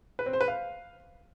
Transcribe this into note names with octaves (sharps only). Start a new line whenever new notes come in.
B4
C4
C5
B4
F5